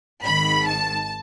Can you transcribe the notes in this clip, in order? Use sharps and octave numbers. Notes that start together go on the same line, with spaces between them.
G#1 G#2 D#3 B5
A5